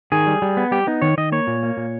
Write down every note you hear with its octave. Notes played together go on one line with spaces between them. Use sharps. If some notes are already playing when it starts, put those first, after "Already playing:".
D#3 G#4
G3
G3
B3
G3 G4
B3 D#4
D#3 C#5
D#3 D#5
A#3 C#5
A#2
A#3
A#2